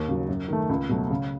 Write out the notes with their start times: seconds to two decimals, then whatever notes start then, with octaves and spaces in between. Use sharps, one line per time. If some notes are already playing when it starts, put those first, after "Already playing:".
Already playing: D#2
0.08 C#3 F#3
0.28 F#2
0.48 D#3 A3
0.69 C#2
0.89 B2 F#3 A3
1.10 C#3